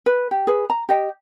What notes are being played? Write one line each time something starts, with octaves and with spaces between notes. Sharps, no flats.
B4
G4
G#4 B4
A#5
G4 D#5 G5